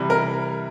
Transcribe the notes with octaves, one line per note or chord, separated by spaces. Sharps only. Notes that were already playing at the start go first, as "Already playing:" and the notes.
Already playing: C3 E3 G3
A#4